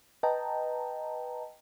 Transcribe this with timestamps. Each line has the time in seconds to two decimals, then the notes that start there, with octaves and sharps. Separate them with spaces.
0.23 B4 D#5 G5 A5 A#5